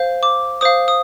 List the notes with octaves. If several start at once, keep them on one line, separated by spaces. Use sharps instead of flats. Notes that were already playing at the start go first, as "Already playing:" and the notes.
Already playing: C5 F5
D6
C5 F5 D#6
D#6